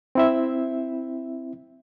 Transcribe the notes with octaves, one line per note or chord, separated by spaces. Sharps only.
C4 E4 E5